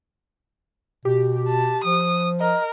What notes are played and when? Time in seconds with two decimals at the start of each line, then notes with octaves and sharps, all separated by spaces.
1.05 B2 G4
1.48 A5
1.84 F3 D#6
2.40 A#4 D#5